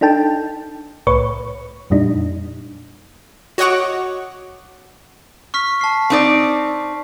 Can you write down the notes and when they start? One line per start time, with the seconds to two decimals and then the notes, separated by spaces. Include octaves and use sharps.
0.01 D4 D#4 A4 G5 A5
1.07 C2 A2 B4 C#5 C#6
1.90 F2 A#2 G3 D4 D#4
3.58 F#4 C#5 D#5 F#5 C#6 D6
5.54 C#6 F6 B6
5.81 A5 C7
6.10 C4 D#4 D5